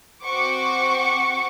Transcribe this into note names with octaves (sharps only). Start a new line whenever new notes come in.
C4 F#4 C5 F#5 C#6 D6